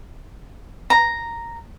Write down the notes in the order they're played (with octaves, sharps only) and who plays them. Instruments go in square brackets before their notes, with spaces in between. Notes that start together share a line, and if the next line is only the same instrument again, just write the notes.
[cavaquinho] A#5